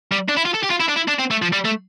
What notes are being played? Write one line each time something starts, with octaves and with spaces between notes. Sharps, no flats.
G3
D4
E4
F4
A4
G4
F4
E4
D4
E4
D4
C4
A3
F3
G3
A3